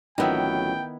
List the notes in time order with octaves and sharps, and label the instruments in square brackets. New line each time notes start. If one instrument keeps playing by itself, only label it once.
[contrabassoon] A1 [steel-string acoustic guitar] F2 F#3 [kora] D#3 B3 E4 [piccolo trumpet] G5